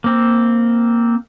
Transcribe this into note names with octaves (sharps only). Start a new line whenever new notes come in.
A#3 C4